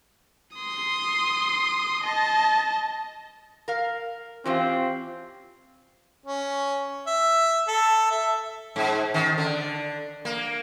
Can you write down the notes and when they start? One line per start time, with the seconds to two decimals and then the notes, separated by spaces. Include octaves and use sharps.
0.56 C6 D#6
2.04 D#5 A5
3.68 A#4 F5
4.46 E3 C4 C#4 F4 G4 F5
6.26 C#4
7.07 E5
7.68 A4
8.11 E5
8.76 G#2
9.14 D#3
9.38 D3
10.25 A#3